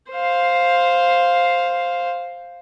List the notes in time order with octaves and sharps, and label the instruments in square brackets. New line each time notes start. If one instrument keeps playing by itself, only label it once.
[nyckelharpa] C5 F5